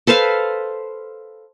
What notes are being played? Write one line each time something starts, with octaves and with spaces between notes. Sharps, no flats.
A4 B4 C5 F5